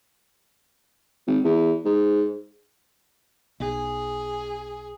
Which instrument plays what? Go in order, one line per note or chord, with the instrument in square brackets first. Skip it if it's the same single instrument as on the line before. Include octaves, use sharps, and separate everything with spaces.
[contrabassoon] G#1
E2
G#2
[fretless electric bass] B1 [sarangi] G#4